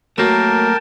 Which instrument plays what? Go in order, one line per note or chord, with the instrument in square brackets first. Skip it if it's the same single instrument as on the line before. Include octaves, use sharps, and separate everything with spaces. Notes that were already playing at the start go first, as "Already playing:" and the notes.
[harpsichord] F#3 [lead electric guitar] A3 A#3 [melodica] A#4 [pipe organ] G5 A5